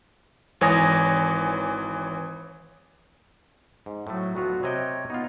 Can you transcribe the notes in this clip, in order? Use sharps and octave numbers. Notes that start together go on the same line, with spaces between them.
G#1 E3 C#5 G#5 D#6 A#6
G#2
A2 F#3 A3
D2 B3 F4 F#4
C3 C#5 D#5 G5
B3 D#4 F4